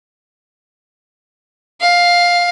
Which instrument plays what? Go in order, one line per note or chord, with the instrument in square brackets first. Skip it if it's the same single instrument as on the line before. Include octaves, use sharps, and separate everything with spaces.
[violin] F5